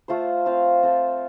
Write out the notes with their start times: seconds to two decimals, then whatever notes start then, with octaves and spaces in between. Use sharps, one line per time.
0.08 A3 F4 C5
0.46 C4 F4 C5 F5
0.83 C4 F4 A4